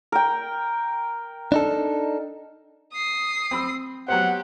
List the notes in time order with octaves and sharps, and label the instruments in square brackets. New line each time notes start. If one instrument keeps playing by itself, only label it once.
[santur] A#4 G5
[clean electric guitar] D4 D#4 A4
[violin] D#6 C7
[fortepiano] C4 B5 E6
[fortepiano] F#3 B3 C5 [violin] G4 [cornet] F#5